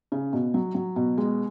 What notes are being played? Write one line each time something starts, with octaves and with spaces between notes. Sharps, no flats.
C#3
B2
F#3
F#3
B2
G#3